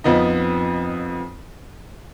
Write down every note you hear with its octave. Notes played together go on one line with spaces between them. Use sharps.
F2 F3 B3 D#4